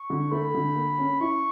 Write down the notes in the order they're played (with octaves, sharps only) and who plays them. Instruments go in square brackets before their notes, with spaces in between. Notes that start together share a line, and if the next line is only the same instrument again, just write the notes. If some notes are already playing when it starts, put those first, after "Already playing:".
Already playing: [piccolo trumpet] C#6
[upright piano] D3
[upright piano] A3 [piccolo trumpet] B5
[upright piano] D3
A#3
C#4
[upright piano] E4 [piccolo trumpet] C#6